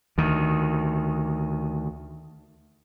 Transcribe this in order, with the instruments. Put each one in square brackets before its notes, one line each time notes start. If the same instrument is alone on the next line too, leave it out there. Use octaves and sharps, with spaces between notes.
[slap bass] D2 D#3